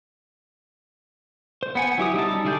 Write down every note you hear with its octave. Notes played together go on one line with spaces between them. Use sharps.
C5
B3 F#5 G#5
F#3 E4 G4 D#6
G3 D#4 E5 A5
D3 G3 G#4 D5 G6